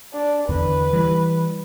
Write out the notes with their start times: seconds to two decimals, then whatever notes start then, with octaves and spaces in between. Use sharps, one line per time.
0.14 D4
0.49 E2 D3 B4
0.93 E3 G3